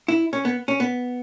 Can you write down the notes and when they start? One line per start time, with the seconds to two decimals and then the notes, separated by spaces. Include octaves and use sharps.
0.08 E4
0.33 C#4
0.45 B3
0.68 C#4
0.80 B3